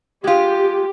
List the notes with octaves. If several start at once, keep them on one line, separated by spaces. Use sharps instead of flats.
G#3 F4 G4